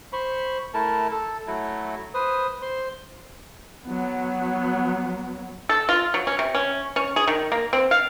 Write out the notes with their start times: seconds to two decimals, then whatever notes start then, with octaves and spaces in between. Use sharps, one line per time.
0.13 C5 B5 C#6
0.74 A3 E4 A#4 A5
1.11 A4
1.47 F#3 A3 E4
2.14 B4 C5 D#6
2.62 C5 C6
3.86 F#3 B3
5.69 A4
5.89 F4
6.14 F#3
6.27 C#4
6.39 C3
6.55 C#4
6.96 C#4
7.16 G#4
7.28 D#3
7.52 A#3
7.73 C4
7.91 F5